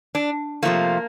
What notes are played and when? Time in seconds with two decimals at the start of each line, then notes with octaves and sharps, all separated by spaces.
0.15 D4
0.63 C3 F3 A3 A#3